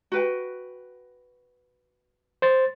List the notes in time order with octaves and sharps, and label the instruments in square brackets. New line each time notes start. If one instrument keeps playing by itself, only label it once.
[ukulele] F#4 B4 G5
[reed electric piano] C5 A6